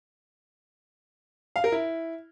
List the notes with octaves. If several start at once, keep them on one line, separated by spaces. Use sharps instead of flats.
F5
A#4
E4